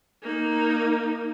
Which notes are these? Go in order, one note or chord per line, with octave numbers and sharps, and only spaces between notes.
A#3 D#4